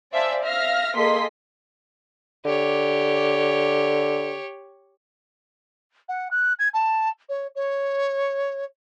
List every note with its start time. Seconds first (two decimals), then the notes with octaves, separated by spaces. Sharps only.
0.12 C5 D5 E5 F5 G#5 A5
0.44 E5 F5 F6 A#6
0.96 A#3 G#4 A4 D#5 C6 B6
2.45 D3 G4 C#5
6.08 F#5
6.31 F#6
6.59 G#6
6.73 A5
7.29 C#5
7.55 C#5